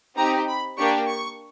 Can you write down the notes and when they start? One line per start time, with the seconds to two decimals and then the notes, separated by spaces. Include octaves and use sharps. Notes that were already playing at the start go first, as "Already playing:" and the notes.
0.17 C4 D#4 G4 A#5
0.48 B5
0.78 A#3 D4 G4 C#6
1.08 C#6